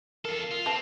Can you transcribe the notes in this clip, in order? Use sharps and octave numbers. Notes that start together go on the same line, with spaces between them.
F4 A4 A#4
F4
C4 B4 A5